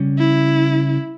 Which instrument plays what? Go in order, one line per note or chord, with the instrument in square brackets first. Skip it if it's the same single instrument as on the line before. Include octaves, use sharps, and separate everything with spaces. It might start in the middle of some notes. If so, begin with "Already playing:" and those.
Already playing: [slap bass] C#3 G3 C#4
[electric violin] E4